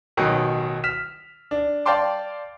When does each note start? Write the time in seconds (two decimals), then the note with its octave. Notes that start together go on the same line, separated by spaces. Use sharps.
0.17 A1 B2 D#3 F#3
0.84 F6 B6 E7
1.51 D4
1.86 D5 F5 G5 A5 C6 D6